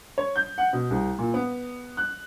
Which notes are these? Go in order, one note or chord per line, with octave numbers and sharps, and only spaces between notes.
C#5
G6
F#5
B2
C2
A#2
B3
F#6